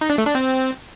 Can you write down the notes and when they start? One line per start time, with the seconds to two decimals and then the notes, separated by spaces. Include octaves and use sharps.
0.01 D#4
0.10 D4
0.18 A3
0.26 D4
0.35 C4